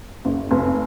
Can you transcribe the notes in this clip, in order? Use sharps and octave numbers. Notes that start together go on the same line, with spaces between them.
F#1
F1